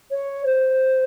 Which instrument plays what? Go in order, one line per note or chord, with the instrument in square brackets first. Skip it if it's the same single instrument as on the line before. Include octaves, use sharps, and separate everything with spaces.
[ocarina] C#5
C5